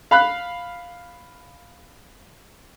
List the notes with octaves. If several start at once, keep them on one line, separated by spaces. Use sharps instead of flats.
F5 B5 F#6